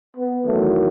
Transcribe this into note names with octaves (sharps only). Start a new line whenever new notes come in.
B3
E2 D#3 F#3 A3